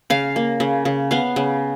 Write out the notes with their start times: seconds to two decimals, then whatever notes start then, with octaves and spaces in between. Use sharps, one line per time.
0.10 C#3 F5
0.36 A#3
0.60 C#3
0.85 C#3
1.11 B3 F5
1.36 C#3